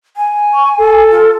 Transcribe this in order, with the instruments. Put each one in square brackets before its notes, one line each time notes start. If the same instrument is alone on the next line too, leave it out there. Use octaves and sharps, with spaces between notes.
[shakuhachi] G#5
[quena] C#6
A4
[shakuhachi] F4